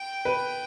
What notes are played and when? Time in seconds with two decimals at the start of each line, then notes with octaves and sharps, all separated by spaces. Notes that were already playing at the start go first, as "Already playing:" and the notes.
Already playing: G5
0.25 B4